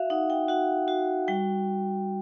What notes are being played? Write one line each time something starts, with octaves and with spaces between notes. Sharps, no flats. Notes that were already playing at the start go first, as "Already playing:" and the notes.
Already playing: F#4 E5 F5
D#4 F#5
G5
F#4 F#5
F#4
G3 G5